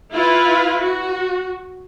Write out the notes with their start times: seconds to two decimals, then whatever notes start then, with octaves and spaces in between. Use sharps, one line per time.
0.12 E4 F4 B4
0.83 F#4